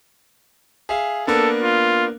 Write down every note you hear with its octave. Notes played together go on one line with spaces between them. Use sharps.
G#4 E5 F5
A#3 B3 D4 A4
F4